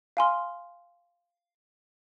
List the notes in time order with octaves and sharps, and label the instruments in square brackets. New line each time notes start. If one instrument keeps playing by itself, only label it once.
[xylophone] F5 G#5 C6 F6